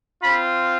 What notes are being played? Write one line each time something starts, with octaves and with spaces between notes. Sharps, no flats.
C4 F4 B5